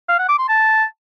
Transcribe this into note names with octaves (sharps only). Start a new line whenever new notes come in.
F5
F#5
D6
C6
A5